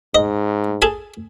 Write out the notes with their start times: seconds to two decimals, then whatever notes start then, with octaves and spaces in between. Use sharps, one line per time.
0.15 G#2 D#5
0.82 G#4 A4 G#5